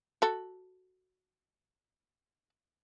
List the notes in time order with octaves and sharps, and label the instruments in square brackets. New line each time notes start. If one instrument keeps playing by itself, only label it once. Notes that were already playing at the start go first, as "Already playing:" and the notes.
[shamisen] F#4 A4